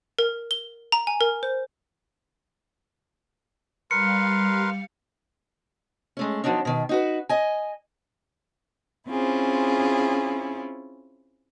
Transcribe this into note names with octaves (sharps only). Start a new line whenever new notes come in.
A#4
G7
A#5
G#5
A#4
C5
G3 A#4 B4 F5 C6 C#7
G#3 A3 C#4
F3 F#3 B3 D4 D#4
B2 D#3
D#4 F#4 B4
D#5 G#5
C4 C#4 E4 F4 G#4